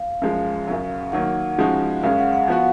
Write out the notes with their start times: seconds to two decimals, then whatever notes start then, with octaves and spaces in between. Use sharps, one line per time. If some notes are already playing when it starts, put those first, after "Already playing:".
Already playing: F5
0.22 F#2 F3 G#3
0.67 F#2 C#3 F#3
1.12 D#3 F#3 A#3 F#5
1.58 C#3 F3 G#3 D#4 F#4
2.03 F#2 C#3 G#3 C#4 F5
2.18 F#5
2.33 F#5
2.48 F3 B3 F#4 F5